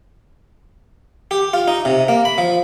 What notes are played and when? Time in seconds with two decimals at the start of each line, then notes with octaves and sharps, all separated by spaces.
1.31 G4
1.53 F4
1.68 D#4
1.85 C3
2.08 A#3
2.25 B5
2.38 F3